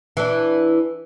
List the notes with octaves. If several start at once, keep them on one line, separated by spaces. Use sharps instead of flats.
E3 D4